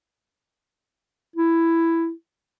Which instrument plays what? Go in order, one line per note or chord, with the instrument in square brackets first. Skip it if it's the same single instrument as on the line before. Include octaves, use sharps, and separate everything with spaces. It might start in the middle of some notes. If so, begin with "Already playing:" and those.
[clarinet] E4